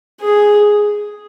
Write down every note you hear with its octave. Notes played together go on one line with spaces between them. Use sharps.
G#4